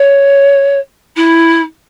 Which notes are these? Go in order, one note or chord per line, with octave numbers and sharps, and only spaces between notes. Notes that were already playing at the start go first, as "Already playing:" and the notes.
Already playing: C#5
E4